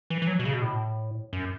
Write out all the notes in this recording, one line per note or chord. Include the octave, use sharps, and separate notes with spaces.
E3
E3
F#3
B2
C#3
B2
A2
F#2